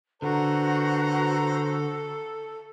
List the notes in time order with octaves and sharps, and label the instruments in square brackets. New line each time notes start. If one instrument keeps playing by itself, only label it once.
[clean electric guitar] D3 [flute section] F#4 [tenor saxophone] A4 [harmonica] B4 C5 A#5